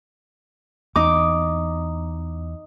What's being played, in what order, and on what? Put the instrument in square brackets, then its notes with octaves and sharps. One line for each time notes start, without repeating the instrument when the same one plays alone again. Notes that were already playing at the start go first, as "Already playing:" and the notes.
[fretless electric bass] E2 [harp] D#4 D6